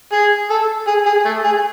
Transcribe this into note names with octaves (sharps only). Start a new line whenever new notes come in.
G#4
A4
G#4
G#4
A3
G#4